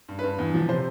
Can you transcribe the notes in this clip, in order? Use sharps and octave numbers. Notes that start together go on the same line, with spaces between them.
G2
G2 B4
E2
F3
C3 C5